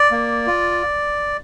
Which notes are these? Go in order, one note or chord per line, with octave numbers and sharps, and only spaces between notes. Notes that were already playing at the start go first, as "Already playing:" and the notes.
Already playing: D5
A#3
F4